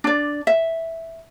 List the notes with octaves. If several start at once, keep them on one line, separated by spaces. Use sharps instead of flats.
D4 D5
E5